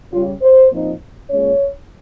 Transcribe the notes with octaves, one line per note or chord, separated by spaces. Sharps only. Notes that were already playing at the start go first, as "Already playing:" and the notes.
C#3 G3 C#4 F4
C5
A#2 F3 C4 D#4
A#2 G#3 C#4 C#5